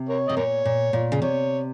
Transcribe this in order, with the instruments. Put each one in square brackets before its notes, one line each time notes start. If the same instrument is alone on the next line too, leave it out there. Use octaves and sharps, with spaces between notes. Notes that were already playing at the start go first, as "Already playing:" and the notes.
Already playing: [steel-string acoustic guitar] C3
[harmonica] A#4 C#5
[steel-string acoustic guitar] C3 [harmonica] D#5
[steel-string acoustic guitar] A#2 [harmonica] A#4 C#5
[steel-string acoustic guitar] A#2
A#2
C#3
[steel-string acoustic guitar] C3 [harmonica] C#5